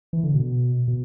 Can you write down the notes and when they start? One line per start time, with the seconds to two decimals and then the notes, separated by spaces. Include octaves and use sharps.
0.13 E3
0.24 D3
0.34 B2
0.88 B2